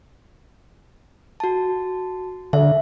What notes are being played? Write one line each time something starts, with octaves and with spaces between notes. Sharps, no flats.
F#4 A5
D3 E5